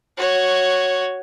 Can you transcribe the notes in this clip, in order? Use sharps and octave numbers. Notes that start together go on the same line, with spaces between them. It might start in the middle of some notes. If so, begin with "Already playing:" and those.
F#4 C#5